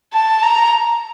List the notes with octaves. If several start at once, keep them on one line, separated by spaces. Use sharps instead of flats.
A5
A#5